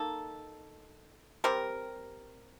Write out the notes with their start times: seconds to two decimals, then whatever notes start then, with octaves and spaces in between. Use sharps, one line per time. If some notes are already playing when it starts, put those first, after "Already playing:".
Already playing: A#3 D#4 A4
1.44 G3 C4 G4 A#4